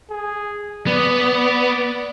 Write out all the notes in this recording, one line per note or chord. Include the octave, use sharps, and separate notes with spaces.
G#4
B3 D5